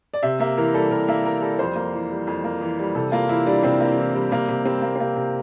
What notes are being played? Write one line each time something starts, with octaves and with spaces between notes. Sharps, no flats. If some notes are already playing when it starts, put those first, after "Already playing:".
D5
C3 E5
A#3 E5
E3 A#4
G3 A4
C3 A#4
A#3 E5
E3 A#4
G3 A4
F2 C5
A#3
E3
G3
F2
A#3
E3
G3
C3 A4
A#3 F4
E3 E4
G3 D4
C3 C4
A#3
E3
G3
C3 A#3
C3
G3 C4
A#3
C4
C3 A#3
C3